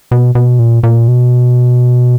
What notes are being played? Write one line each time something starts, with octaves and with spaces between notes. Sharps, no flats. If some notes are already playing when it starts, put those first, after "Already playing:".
B2
B2
A#2
A#2
B2